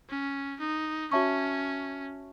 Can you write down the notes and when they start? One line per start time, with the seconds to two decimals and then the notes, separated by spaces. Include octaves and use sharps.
0.09 C#4
0.60 D#4
1.11 C#4 F#4 C#5 E5 A5 C#6